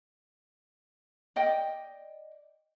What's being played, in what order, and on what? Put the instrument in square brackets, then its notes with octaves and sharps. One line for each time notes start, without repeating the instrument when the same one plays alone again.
[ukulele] D5 D#5 G5